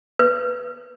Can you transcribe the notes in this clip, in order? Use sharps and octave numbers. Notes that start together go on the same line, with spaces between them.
B4